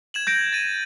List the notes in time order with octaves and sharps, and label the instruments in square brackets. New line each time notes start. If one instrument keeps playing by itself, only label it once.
[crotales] G#6 E7 F#7
[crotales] G6 [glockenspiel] G#6 A#6 D7
[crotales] A6 D#7